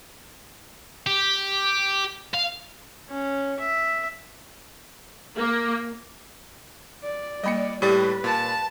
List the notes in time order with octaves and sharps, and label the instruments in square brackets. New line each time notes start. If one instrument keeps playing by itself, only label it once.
[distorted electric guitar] G4
F5
[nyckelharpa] C#4
E5
[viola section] A#3
[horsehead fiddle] D5
[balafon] G3 A#3 [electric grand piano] D#5 B5 C#7
[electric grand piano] A2 G3 A6 [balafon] G4 D5 [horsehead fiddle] B4
[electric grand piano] A#2 [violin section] A5